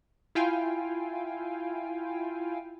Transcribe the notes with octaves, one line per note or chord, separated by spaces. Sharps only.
E4 F4 F5 G5 G#5